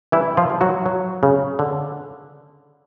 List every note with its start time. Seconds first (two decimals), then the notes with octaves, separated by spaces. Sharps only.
0.12 E3 G3 E4
0.37 F3 F4
0.50 G3
0.61 F#3 F#4
0.86 F#3
1.23 C#3
1.59 D3